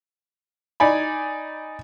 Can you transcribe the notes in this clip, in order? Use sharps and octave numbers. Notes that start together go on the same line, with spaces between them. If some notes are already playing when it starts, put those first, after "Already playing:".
D#4 D5 G#5 B5